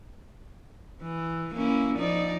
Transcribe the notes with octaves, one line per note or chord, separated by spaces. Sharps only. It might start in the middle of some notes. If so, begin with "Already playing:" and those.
E3
A#3 C#4 E4
F3 D#4 D5